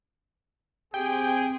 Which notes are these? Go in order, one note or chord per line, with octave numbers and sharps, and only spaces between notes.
C4 G4 G#4 G5